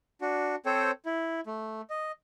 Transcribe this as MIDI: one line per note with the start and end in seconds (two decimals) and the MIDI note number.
0.21 0.56 62
0.21 0.56 66
0.66 0.91 60
0.66 0.91 69
0.66 0.91 72
0.66 0.91 73
0.66 0.91 79
1.06 1.41 64
1.47 1.82 57
1.90 2.12 75